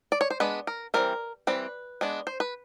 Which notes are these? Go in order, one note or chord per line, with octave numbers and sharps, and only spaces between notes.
D5
C#5
C5
G#3 B3 D4 B4
A#4
E3 G3 C4 A#4
E3 G3 C4 B4
G#3 B3 D4
C5
B4